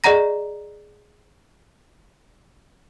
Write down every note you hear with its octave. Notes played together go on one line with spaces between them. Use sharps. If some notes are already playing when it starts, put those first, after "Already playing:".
G#4 D5 D#5 F#5 A#5 A#6